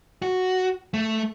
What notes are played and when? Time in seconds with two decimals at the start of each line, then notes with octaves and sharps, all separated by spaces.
0.22 F#4
0.94 A3